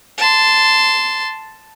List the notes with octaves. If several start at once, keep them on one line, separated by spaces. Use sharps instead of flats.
A5 C6